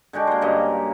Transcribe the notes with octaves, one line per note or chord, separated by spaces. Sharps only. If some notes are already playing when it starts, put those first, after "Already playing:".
D3 G#3 F#4 G4
A#3 C5
G2 C#3 A#4 D#5